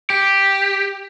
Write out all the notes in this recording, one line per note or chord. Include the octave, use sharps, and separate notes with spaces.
G4